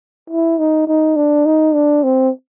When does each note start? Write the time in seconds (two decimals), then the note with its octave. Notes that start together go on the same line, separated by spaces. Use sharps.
0.30 E4
0.59 D#4
0.88 D#4
1.16 D4
1.46 D#4
1.74 D4
2.03 C4